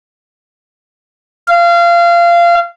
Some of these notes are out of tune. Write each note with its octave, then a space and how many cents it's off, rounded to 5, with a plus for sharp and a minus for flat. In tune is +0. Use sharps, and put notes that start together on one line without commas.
F5 -25